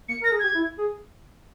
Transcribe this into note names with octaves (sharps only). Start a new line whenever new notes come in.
A#3 C#7
A#4 A#6
G#4
G4 G#6
E4
G#4